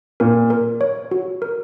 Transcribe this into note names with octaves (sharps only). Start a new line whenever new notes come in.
A#2 A#4
A#4
C#5
F#4
A#4